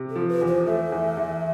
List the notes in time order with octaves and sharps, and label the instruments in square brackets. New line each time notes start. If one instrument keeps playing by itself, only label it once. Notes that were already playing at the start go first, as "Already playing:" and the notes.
Already playing: [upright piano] C3
[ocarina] A4
[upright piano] F3
[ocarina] B4
[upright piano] E2
[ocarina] C5
[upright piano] A3 [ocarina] E5
[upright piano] E2
E2